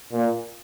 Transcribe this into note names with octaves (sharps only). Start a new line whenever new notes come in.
A#2